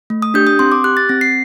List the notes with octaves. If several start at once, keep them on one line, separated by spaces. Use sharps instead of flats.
A3
D#6
D4 G4 G6
D#6
C4 C6
D6
G4 F#6
A6
C4 A#6
C7